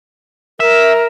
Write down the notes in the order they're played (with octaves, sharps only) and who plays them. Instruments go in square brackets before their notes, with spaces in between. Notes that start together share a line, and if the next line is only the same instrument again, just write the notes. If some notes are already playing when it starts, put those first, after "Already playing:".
[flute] A#4 [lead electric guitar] E5